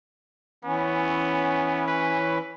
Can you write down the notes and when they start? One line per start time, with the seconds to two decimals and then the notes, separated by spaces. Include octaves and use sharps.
0.65 E3 B3 C#4
1.88 B4